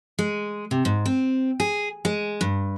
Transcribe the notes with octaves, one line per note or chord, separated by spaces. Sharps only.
G#3
C3
G#2
C4
G#4
G#3
G2